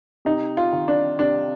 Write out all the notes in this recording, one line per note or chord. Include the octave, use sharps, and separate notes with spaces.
C3 D#4
F4
D#3
D4
C3 D4